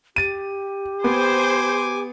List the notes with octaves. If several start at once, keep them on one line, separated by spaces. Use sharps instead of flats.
G4 A6 D#7
B3 C5 G#5 D6